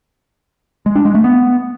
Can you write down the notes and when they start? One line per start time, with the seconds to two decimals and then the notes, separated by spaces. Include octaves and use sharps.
0.86 G#3
0.96 D4
1.05 G#3
1.15 A3
1.24 B3